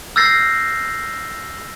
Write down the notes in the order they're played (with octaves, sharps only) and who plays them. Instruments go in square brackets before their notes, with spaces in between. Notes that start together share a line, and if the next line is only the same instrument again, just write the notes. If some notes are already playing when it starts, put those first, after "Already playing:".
[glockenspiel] E6 F6 G6 A6 A#6 C7